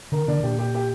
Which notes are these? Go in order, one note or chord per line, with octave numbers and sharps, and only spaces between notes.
D3 A#4
D3 D4
A#2 G4
G4
G4